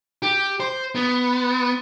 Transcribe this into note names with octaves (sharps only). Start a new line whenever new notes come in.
G4
C5
B3